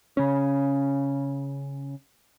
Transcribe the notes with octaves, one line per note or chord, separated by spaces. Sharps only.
C#3 C#4